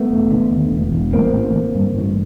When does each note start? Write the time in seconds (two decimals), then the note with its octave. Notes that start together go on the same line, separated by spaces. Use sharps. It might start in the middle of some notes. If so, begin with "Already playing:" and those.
Already playing: A3 B3
0.11 E1
0.31 D3
0.51 D#2
0.72 E1
0.92 E1
1.13 A1 A#3 C4
1.34 A1
1.54 D3
1.75 G2
1.95 A1